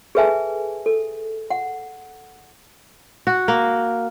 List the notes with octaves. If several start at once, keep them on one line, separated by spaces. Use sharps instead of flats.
G#4 A4 B4 E5 G#5 A5
A4
F#5
F#4
A#3